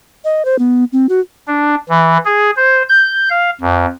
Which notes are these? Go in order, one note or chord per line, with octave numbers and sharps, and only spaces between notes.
D#5
C5
B3
C4
F#4
D4
E3
G#4
C5
G6
F5
F2